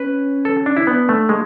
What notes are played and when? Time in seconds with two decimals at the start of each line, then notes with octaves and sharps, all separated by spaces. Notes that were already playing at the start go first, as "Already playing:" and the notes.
Already playing: C#4 B4
0.45 A4
0.66 D4
0.77 E4
0.87 B3 D4
1.09 A3
1.29 G#3 A#3